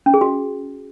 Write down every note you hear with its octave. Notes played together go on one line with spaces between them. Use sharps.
C#4
G#4
F#4